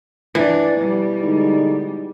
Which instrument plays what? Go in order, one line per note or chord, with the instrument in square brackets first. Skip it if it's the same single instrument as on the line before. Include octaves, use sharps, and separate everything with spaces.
[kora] E3 [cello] D4
[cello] B2 G3
[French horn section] D3 G#3 D#4